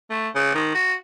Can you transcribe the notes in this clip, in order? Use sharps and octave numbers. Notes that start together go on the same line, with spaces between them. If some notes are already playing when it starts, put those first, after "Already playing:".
A3
C#3
D#3
F#4